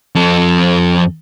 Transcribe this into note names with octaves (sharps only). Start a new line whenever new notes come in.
F2 A4